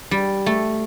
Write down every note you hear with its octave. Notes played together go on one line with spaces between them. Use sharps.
G3
A3